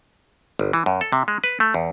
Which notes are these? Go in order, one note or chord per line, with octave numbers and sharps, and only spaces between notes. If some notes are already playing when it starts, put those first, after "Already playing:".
G1
E3
F#2
A4
C3
G#3
B4
A3
E2